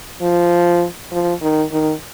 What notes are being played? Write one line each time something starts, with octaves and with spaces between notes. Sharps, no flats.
F3
F3
D#3
D#3